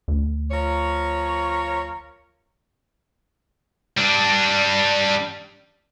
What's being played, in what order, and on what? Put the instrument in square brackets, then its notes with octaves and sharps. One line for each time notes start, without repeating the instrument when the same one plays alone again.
[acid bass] D2
[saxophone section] F3 A#4 C#5
[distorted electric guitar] G3 D4